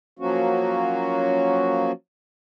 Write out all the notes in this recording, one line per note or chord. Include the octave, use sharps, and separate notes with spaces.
F3 F#3 A#3 C#4 F#4